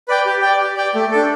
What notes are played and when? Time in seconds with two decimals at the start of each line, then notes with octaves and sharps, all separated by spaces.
0.08 B4 D5 G5
0.25 G4
0.42 D5 G5
0.60 G4
0.77 D5 G5
0.95 A3
1.11 D4 A4